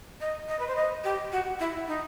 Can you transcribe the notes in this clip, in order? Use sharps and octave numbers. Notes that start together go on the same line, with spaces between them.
D#5
D#5
B4
C5
D#5
G4
F#4
E4
D#4